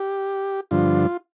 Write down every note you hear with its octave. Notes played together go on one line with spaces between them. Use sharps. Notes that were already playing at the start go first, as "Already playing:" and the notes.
Already playing: G4
G2 D3 F3 F4